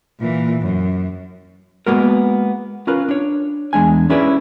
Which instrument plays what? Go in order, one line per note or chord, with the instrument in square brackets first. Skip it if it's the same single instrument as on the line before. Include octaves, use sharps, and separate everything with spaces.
[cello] A#2 E3
F#2
[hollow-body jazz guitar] G#3 A#3 B3 F#4 A#4
C#4 F4 A#4 B4
D4 C#5
E2 G#3 D4 G#5
C#4 E4 G#4 B4 C#5 D5